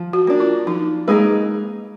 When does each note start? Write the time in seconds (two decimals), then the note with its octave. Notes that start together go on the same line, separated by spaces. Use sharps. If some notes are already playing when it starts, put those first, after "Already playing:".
Already playing: F3
0.13 F#4
0.27 A#3 D4
0.40 F4
0.67 F3 D#4
1.08 G#3 A#3 D#4 G#4 B4